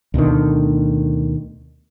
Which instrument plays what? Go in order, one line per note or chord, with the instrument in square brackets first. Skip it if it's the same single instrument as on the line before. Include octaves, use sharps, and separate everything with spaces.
[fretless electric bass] D2 B2 D3 D#3